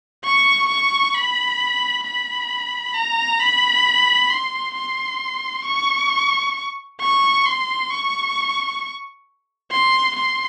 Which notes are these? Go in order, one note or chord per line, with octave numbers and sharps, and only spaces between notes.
C#6
C#6
B5
B5
A#5
B5
C6
C6
C#6
C#6
C6
C#6
C6
C6